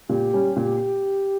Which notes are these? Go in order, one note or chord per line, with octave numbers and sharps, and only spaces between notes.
A#2 G4
G3 C#4
A#2